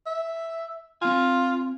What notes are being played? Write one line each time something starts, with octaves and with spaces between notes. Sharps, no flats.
E5
C4 F4 G#5